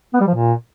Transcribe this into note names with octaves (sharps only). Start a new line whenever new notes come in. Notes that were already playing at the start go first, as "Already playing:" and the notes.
B3
G3
F3
A#2